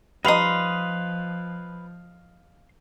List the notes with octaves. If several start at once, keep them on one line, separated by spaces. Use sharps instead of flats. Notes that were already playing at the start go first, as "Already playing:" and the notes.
F3 G3 D#4 B4 D#5 F5 C6 D#6